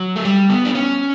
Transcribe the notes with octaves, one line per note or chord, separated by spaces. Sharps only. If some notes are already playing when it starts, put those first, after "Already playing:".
Already playing: F#3
A3
G3
B3
D4
C#4